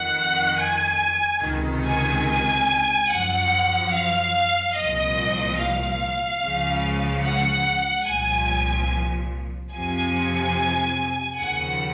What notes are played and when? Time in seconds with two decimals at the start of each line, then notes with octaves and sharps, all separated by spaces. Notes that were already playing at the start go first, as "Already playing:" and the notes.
Already playing: F2 D#3 F#5
0.60 G#5
1.44 C#2 C3 D#3
1.85 G#5
2.27 G#5
3.09 F#2 F3 F#5
3.92 F5
4.75 C2 A#2 F3 D#5
5.58 F5
6.41 C#2 C#3 F3
7.24 F#5
8.06 C2 A#2 F3 G#5
9.72 F2 C3 F3 G#5
11.38 D#2 C#3 F3 F#5